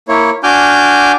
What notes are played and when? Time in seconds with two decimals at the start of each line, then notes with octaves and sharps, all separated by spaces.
0.08 A#3 E4 C#5
0.44 D4 F#4 G#5 D6 F6 G6